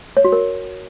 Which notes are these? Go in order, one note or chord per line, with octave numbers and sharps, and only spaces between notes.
C#5
F#4
A#4